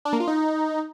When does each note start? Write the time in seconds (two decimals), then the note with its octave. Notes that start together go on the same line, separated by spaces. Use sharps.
0.05 D4
0.13 A#3
0.20 F4
0.27 D#4